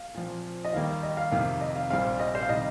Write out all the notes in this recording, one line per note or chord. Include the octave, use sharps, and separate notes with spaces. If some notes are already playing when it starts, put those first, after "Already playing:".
Already playing: F5
A#2 F3 C4
D#5
D#2 D#3 G3 A#3 F5
D#5
F5
F2 C3 D#3 A#3 F5
D#5
F5
A#1 A#2 G3 C4 F5
D#5
C5
F5
C3 D#3 G3 D#4 D#5